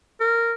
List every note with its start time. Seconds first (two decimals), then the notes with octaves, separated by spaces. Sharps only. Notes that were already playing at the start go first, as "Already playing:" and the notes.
0.20 A#4